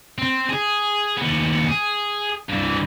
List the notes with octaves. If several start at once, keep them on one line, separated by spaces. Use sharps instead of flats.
C4
G#4
D#2 B3
G#4
G2 E3